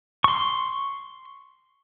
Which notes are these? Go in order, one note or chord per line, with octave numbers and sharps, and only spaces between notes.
C6 C#6